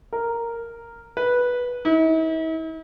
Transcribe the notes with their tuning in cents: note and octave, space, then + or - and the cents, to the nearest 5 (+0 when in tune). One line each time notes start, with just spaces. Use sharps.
A#4 -5
B4 -10
E4 -45